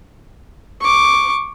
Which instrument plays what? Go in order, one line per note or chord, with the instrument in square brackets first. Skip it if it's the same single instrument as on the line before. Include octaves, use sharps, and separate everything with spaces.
[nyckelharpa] C#6 D6